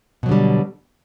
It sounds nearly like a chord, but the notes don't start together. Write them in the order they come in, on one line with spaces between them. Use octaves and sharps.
B2 F#3 D3 G3